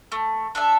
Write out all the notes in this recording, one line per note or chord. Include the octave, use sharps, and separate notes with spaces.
A3
D4 A4 E5